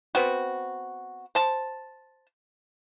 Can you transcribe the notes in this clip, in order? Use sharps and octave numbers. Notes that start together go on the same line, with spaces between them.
B3 C4 F#4
C5 A5